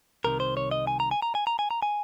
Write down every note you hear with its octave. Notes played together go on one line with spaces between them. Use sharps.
C2 C3 D#3 A#4
C5
C#5
D#5
G#5
A#5
G#5
A#5
G#5
A#5
G#5
A#5
G#5